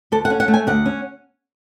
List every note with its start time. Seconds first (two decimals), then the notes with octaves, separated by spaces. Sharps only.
0.12 D2 A4
0.25 F#5
0.30 C#4
0.40 F#5
0.48 A3
0.54 G#5
0.67 D2 F#5
0.86 C#4